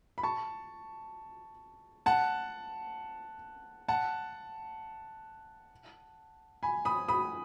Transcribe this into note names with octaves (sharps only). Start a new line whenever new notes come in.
B5
A5 C#6
F#5 A5
F#5 A5
G#5 B5
B5 D#6
B5 D#6